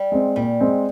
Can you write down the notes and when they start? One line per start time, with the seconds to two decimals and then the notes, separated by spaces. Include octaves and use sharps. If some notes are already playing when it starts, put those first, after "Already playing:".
Already playing: G3
0.12 G#3 C4
0.36 A#2 G3
0.61 G#3 C4